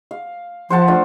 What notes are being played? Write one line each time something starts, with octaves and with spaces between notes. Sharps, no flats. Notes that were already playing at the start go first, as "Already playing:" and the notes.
F5
F3 C5 F#5 A5
A3 D4 F4